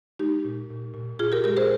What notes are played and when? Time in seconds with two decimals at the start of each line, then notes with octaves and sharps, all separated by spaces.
0.19 G#3 D#4 G4
0.45 A#2
0.70 A#2
0.94 A#2
1.19 A#2 F4 G#4
1.32 G4 A#4
1.44 G#3 G4 A#4
1.57 G#4 C5